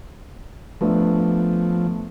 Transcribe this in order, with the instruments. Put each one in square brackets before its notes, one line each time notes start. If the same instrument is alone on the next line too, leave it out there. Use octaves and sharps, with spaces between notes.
[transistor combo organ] F3 [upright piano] A3 B3 D4